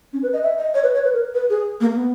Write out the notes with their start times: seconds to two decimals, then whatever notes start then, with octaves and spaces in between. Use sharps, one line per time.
0.13 C#4
0.23 B4
0.33 D#5
0.43 E5
0.58 D#5
0.74 C#5
0.83 B4
0.94 C#5
1.04 B4
1.14 A#4
1.34 B4
1.50 G#4
1.81 A#3
1.95 B3